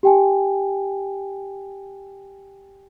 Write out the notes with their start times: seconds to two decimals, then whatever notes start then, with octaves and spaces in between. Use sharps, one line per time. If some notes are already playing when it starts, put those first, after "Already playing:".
0.03 G4 G5 G#5